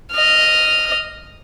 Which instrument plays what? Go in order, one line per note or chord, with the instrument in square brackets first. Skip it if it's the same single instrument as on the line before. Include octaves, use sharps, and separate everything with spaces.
[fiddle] D#5 F6